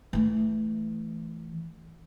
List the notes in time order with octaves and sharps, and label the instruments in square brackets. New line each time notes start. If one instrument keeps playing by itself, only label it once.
[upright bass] E3 A3